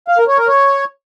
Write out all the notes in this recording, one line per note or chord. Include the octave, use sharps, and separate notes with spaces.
F5
A#4
C#5
A#4
C#5